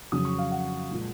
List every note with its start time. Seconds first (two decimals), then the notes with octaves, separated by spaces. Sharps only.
0.12 F2 C#3 F#3 D#6
0.25 C#6
0.38 F5
0.51 F#5
0.90 A#2 F3 G#3